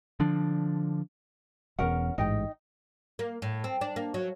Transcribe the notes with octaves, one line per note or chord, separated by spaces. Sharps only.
D3 F3 D4
E1 E2 C#4 A#4 F#5
A1 G#2 D#4 D#5 G5
A#3
A2
C4
D4
A#3
F#3